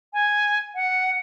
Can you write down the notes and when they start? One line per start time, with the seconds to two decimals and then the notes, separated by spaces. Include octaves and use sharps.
0.13 G#5
0.75 F#5